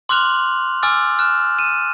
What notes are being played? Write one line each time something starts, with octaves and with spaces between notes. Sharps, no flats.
C6 D6 F6 F#6 F7 F#7
G#5 D6 E6 F6 A6
F6 F#6 E7
D#7 E7